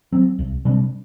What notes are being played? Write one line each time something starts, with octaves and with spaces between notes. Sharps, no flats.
F#3 C4
C2
C3 G3 D4